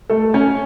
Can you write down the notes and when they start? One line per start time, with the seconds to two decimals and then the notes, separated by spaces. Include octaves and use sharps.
0.09 A3 A4
0.34 C#4 C#5